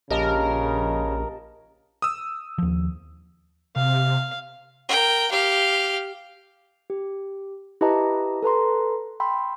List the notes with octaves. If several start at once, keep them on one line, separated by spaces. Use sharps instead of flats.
A#1 C#3 G4 A#4 D#5 A5
D#6 E6
D#2 F3
C3 F5
A#4 G5
G4 F5
G4
E4 G4 B4 D#5 A5 A#5
A4 B4 A#5 C6
G5 B5 C6 E6